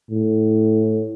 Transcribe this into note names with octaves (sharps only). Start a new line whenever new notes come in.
A2